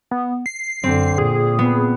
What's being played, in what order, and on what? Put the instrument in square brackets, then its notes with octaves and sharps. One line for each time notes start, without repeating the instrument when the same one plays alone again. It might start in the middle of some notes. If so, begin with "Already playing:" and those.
[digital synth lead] B3
C7
[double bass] F#2 D3 [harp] C4
[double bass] A#2 [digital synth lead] G#4
[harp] B3